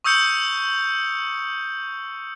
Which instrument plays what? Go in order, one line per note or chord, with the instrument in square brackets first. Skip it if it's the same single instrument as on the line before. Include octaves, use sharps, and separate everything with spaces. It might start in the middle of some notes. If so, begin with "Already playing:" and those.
[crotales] C#6 D#6 E6 G6 C#7 G7